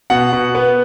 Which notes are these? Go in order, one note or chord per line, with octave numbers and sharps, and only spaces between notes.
B2 F#5
B2
B3